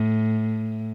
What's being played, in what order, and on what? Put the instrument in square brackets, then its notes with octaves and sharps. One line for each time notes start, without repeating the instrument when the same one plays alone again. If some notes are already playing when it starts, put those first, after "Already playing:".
Already playing: [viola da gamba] A2